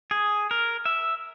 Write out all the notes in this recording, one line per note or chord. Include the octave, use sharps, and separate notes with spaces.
G#4
A#4
E5